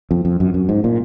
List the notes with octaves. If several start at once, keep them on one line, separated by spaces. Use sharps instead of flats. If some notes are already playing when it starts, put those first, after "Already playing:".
F2
F2
F#2
F#2
G#2
A#2